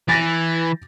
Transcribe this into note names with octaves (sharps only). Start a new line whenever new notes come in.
E3 A6 A#6